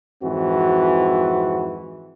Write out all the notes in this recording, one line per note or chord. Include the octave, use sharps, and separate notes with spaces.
F2 G#2 E3 C4 F#4